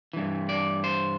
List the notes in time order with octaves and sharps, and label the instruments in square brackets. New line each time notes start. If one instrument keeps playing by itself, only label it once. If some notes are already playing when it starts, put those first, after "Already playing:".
[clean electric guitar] G2 E3
D5
C5